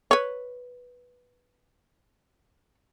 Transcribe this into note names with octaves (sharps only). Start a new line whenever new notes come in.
B4 C#5